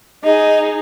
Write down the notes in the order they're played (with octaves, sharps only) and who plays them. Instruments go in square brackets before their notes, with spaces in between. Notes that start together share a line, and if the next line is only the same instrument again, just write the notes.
[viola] D#4 G#4 [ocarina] D#5